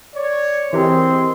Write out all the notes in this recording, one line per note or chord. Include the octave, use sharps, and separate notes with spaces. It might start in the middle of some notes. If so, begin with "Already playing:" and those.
C#5 D5
E3 C4 G4 G#4 A#4 D#5 C6